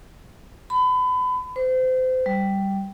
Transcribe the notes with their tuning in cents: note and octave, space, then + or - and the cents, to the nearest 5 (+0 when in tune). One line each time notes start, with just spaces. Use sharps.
B5 +30
C5 -30
G3 -5